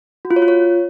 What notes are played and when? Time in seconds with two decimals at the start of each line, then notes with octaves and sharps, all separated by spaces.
0.25 F#4
0.31 F4
0.36 C#5
0.42 F4
0.48 C#5